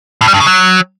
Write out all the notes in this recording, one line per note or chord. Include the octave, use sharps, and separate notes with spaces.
A2
G3
G2
C#3
F#3